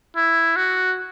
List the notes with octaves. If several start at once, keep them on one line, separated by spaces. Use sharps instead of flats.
E4
F#4